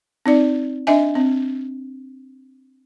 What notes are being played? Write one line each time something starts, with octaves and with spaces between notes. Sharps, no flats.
C4 D#4 D5
D4 D#5 E5 G#5
C4